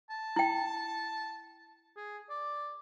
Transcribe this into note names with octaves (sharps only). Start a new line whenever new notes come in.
A5
E4 G5
G#4
D5